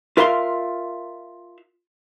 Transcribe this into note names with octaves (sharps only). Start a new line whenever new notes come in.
F4 A#4 E5 F5 A#5 C6